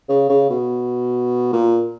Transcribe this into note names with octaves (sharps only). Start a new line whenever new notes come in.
C#3
C#3
B2
A#2